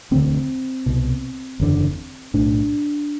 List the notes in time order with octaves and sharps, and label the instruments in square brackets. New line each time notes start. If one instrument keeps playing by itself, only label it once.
[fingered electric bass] E1 D2 D3 C4
C2 B2
F#1 E2 D3
B1 A2 D4